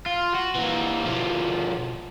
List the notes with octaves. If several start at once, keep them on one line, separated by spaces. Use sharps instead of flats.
F4
F#4
E3 A#3
B2 F3